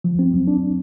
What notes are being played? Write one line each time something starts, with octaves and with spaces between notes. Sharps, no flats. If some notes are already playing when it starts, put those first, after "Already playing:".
F3
C4
F#3
D4